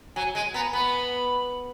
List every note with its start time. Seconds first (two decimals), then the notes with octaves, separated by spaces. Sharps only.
0.16 F#3 G#5
0.35 G#3 G#5
0.54 B3 A#5
0.73 B3 B5